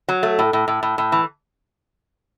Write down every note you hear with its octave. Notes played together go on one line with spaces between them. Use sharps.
F#3
A3
A2
A2
A2
A2
A2
E3